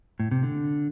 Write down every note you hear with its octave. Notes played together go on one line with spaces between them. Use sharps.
A2
C3
D3